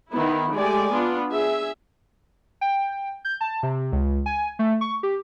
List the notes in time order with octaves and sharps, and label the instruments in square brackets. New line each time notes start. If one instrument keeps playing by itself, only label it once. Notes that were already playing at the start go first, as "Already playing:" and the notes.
[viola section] D#3 B3 E4
G#3 A3 G4 D5 G#5
B3 D4 F4
G#4 E5
[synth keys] G5
G6
A5
C3
C#2
G#5
A3
C#6
G4